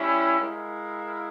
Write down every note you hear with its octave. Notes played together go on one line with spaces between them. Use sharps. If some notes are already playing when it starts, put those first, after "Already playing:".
Already playing: G3 C#4 E4
G#3 E4 A#4 F5